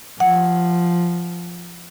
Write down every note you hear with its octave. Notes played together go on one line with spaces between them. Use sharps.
F3 F#5